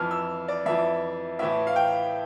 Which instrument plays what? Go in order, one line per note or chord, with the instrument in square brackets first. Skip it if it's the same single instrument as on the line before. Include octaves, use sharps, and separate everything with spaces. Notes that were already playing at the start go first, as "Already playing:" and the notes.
Already playing: [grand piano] F2 E3 F6
E6
D5
F2 E3 E5
A2 E3 E5
F5
G5